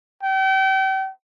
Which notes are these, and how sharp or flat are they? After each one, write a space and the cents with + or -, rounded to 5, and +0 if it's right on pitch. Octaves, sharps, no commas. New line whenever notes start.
G5 -35